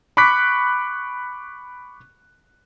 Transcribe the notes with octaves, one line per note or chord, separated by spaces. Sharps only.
B5 C#6 D6 F#6 B6